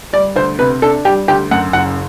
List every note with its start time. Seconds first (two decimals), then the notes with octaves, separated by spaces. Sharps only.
0.13 G3 D5
0.36 D2 C5
0.59 C3 B4
0.82 D4 A4
1.05 G3 G4
1.28 D2 G4
1.51 F#2 F#5
1.73 F#1 F#5